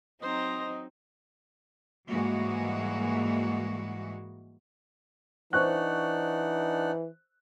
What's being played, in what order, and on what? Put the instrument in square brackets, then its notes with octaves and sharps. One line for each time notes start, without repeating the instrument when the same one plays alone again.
[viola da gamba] F#3 C4 D#4 [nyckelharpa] C5 A#5 [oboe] D#5
[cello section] G#2 E3 G3 G#3 A#3 F#4
[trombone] E3 [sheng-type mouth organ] D4 D#4 F#5 [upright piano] C5 C#6 F#6